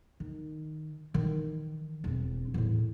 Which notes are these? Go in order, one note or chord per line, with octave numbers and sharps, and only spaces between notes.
D#3
D#3 E3
E1 C4
E2 A2